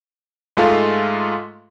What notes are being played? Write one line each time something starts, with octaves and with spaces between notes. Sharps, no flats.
G#2 G#3 A3 F4 A4 F5